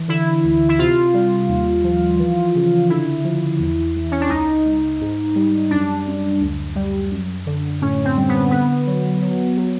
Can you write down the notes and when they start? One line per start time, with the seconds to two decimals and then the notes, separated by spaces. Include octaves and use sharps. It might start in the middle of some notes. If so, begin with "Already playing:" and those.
Already playing: E3
0.08 D3 E4
0.44 D2
0.69 E4
0.78 C3 F4
1.14 G3
1.48 D#2
1.84 F3
2.19 E3
2.55 C#3
2.90 D3 E4
3.24 F3
3.59 E2
3.96 E2
4.12 C#4
4.21 D4
4.30 C#2 D#4
4.65 C#2
5.01 G#2
5.35 G3
5.70 F#2 D4
6.06 F#2
6.40 D2
6.75 G3
7.11 F#2
7.46 D3
7.82 A2 C#4
8.05 C4
8.16 G3
8.29 B3
8.51 D3 B3
8.86 F#3
9.21 F#3
9.57 F#3